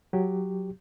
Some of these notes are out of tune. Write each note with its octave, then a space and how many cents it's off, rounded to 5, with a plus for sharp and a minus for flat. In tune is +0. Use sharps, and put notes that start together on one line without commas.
F#3 +0 G4 +0